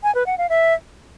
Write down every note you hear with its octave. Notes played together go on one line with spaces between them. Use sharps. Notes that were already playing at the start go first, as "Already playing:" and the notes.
G#5
B4
F#5
F5
E5